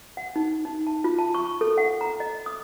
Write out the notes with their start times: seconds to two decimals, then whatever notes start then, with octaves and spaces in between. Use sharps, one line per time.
0.17 F#5
0.36 D#4
0.65 D#4
0.87 A5
1.04 F4
1.19 A5
1.34 C#6
1.61 A4
1.78 F#5
2.01 A#5
2.20 D#5
2.46 D#6